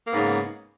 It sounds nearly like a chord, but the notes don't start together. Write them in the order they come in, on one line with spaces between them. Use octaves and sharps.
A#3 B3 G#2 C#3